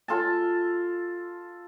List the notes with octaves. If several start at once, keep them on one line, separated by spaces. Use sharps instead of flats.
F4 A4 A5